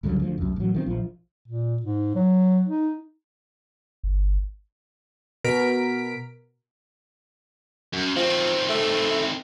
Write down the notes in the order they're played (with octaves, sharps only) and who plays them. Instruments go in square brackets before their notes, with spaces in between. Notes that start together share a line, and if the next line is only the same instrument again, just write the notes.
[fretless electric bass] C#2 G2 D3 F#3
D2 F3
C2 F#2
A1 F#3
D#3 E3 C4
A#1 F3
[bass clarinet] A#2
G#2
F#3
D#4
[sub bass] G1
[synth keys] B2 A#4 B6 D7
[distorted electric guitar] F#2
[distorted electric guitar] D#3 C4 [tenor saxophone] F3
[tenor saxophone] A3